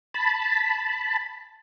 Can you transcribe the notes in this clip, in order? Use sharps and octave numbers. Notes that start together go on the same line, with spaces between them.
A5 B5